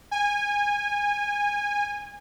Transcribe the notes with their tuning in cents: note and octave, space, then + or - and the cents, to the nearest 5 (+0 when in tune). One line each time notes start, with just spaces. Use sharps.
G#5 -20